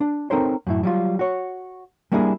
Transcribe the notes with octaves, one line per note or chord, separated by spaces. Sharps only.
D4
C4 D#4 A4 A#4 C5 C#5
F#2 A2 E4
F#3 G3 F4
F#4 C#5
G3 A#3 D4 E4 F4 G#4